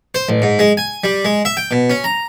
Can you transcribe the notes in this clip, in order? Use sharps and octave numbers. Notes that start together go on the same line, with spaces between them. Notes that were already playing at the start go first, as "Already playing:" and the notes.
C5
A1
G#2
G#3
G#5
G3
G#3
E5
G5
B2
C#4
A#5